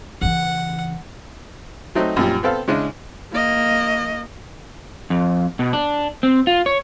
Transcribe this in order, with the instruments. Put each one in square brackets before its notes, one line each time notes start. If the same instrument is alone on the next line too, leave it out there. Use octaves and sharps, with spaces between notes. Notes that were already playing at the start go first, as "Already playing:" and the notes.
[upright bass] C#3 E3 [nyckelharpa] F#5
[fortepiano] F#3 A3 C4 D#4
F#2 A#2 F3 G3
B3 C4 A4 F5
C#3 G#3 C#4 D4 E4
[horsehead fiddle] A#3 D#5
[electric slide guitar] F2
B2
D4
C4
F4
C#5